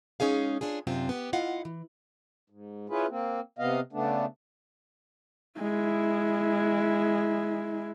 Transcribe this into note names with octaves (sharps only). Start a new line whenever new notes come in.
G#3 C#4 D#4 G#4 F5
C#4 D4 F4 G#4
F#2 C3 C4 D4 F4
B3 G4
E4 F4 D#5 F5 F#5
E3
G#2
C#4 E4 F4 G#4 B4
A#3 C4
C3 B3 D#5 F5
C#3 A3 B3 D4
G#3 E4